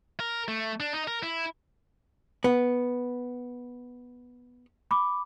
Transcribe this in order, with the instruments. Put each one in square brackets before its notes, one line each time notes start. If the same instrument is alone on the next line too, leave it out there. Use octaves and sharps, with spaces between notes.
[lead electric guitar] A#4
A3
D4
D#4
A#4
E4
[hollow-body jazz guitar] B3
[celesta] B5 D6